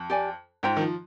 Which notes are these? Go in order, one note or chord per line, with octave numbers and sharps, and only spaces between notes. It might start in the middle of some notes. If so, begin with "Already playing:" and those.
Already playing: F2
G4 D5 G#5
G#2 F4 C5 G5 A#5
D#3
F3